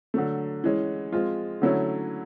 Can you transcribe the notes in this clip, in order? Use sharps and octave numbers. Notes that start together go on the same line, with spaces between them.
D3 F#3 A3
E3 G#3 C#4
F3 G#3 C4 F4
D3 F#3 A3 C#4 E4